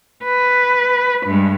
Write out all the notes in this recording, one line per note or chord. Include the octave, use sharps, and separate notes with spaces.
B4
G2 G#3